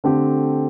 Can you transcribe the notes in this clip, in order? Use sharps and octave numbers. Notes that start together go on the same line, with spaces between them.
D3 A3 C4 G4